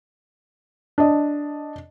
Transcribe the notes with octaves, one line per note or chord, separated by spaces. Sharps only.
D4 D#5